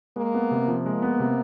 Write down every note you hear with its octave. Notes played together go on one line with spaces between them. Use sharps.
G#3 A#3
B3
C3
F3
G#3 A#3
B3
C3